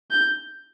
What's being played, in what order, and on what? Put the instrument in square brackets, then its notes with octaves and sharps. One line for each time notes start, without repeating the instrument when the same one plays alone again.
[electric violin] G6